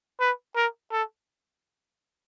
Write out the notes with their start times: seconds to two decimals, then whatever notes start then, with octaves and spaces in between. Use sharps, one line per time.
0.20 B4
0.56 A#4
0.92 A4